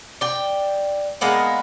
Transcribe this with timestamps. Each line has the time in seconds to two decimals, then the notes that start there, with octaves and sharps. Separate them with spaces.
0.21 D5 G5
1.21 G#3 A#3 B3 D4